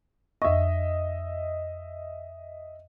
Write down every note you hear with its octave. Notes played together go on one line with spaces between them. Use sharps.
F2 D#5 E5 C#6